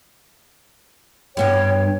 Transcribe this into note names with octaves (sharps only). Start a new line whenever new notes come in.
G2 B3 G4 C#5 G5